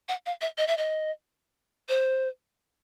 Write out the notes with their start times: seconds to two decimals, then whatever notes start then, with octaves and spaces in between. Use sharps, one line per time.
0.09 F#5
0.26 F5
0.41 E5
0.58 D#5
0.67 E5
0.77 D#5
1.89 C5